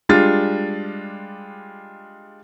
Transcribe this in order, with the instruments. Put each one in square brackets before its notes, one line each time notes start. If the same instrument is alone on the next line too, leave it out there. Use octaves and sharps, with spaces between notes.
[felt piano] G3 G#3 D4 F4 A6